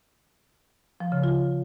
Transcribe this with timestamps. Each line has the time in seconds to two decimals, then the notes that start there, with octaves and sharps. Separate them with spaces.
1.00 F3
1.12 C#3
1.24 F4